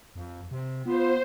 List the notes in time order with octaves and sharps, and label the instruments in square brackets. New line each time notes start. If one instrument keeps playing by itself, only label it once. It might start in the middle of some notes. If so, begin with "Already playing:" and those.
[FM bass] F2
C3
[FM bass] B3 [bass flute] F4 [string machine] C5